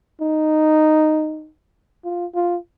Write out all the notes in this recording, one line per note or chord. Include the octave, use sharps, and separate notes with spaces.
D#4
F4
F4